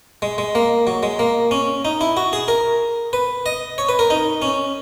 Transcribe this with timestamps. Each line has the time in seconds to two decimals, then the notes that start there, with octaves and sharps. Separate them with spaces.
0.22 G#3
0.38 G#3
0.55 A#3
0.87 F#3
1.03 G#3
1.19 A#3
1.51 C#4
1.85 D#4
2.01 E4
2.17 F#4
2.33 G#4
2.48 A#4
3.13 B4
3.46 D#5
3.78 C#5
3.89 B4
3.99 A#4
4.10 D#4
4.42 C#4